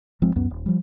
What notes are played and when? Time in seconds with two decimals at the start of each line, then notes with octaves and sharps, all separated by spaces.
0.22 G1 F3 G#3 C4
0.36 C#2 F#2 B3
0.50 D#1
0.66 F3 G3